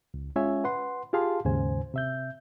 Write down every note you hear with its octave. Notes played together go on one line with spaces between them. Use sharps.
C#2
G#3 C#4 F4 C#5 E5 G#5
B4 F#5 C6
F4 G4 G#4 F5 A5 C6
D#2 G#2 C#3 C5 G#5
C3 E5 G6